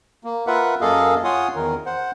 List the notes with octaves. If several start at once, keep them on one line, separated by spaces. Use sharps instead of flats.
A#3
F4 A#4 B4 E5 F#5
F#2 A#3 G#4 A4 D#5 F5
F4 C#5 F#5 G#5 C6 D#6
E2 D#3 A#4
C5 F#5